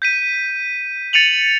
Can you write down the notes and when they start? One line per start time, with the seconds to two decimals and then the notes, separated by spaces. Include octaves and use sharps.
0.02 G6 B6 D#7
1.13 A6 C#7 D#7 F7 F#7